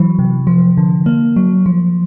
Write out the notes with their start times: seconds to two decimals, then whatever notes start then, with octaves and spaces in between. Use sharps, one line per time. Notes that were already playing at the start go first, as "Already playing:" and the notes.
Already playing: E3 F#3
0.19 C3
0.47 F3
0.77 D3
1.06 A#3
1.36 F#3
1.66 F3